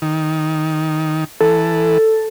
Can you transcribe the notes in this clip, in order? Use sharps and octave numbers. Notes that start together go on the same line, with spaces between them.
D#3
E3 A4